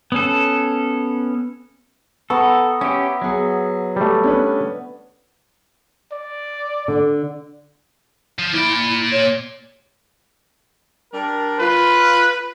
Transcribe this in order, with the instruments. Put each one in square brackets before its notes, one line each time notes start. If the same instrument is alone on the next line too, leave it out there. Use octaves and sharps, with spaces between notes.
[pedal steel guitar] B3 C#4 A4
[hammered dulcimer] B3 A#5 [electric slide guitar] A4 [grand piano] C#6
[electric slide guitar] C#4 G4 [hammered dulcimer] E5
[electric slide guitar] F#3 [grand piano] B3 G#4
[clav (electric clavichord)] G3 A3
[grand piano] C#4 D4 B4
[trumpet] D5
[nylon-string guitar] D3
[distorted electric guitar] F3
[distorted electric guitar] A#2 D5 [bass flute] E4
[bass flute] C#5
[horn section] G3 D4 A#4
[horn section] F4 [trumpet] B4